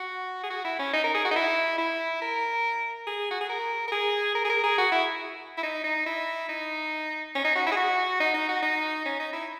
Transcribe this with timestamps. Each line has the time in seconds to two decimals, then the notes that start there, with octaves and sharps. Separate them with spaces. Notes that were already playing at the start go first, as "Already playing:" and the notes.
Already playing: F#4
0.43 G#4
0.50 F#4
0.64 E4
0.79 C#4
0.93 D#4
1.03 A#4
1.14 G#4
1.25 F#4
1.31 D#4
1.36 E4
1.78 E4
2.21 A#4
3.07 G#4
3.31 F#4
3.41 G#4
3.49 A#4
3.88 A#4
3.92 G#4
4.35 A#4
4.44 G#4
4.50 A#4
4.63 G#4
4.78 F#4
4.92 E4
5.57 E4
5.63 D#4
5.84 D#4
6.06 E4
6.49 D#4
7.35 C#4
7.44 D#4
7.55 F#4
7.66 E4
7.72 G#4
7.76 F#4
8.20 D#4
8.34 D#4
8.48 F#4
8.62 D#4
9.05 C#4
9.19 D#4
9.33 E4